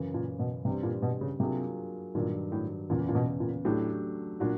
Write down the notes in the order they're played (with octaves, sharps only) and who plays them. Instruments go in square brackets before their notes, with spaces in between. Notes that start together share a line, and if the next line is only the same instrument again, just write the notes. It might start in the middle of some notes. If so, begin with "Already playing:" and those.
Already playing: [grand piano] F#2 C#3 E3
[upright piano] A#2
B2
[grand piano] G2 E3 G3 C4 [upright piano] C3
[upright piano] A#2
B2
C#3
[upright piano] C3 [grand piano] F#3 A#3 D4 F4 G#4
[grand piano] G2 D#3 F#3 [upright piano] A#2
[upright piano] A2
[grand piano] E2 C#3 E3 [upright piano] A#2
[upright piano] A#2
B2
A#2
[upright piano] A2 [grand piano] F#3 A3 D4 G4
[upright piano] A#2 [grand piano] F#3 A#3 D4 F#4